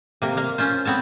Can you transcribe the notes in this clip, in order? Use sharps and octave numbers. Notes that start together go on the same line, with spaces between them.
C3 A#3
A#3 F5
C#4 F4 C5
B3 C4 C#5 A5